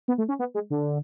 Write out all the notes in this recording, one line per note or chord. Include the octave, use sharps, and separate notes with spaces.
B3
A3
C#4
B3
G#3
D3